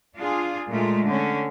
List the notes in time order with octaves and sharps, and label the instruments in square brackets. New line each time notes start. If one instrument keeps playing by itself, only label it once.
[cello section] D4 F4 G#4
A#2 G#3 A3 F4
D3 C#4